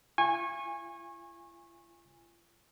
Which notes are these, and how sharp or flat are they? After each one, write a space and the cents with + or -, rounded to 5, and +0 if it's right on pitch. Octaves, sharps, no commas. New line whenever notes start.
F4 -45 G#5 -20 C#6 -25